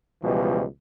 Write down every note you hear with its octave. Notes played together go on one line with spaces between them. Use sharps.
C#2 B2 E3 F3 G3